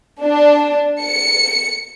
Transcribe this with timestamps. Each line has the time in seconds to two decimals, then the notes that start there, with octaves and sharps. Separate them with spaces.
0.22 D4
1.02 C#7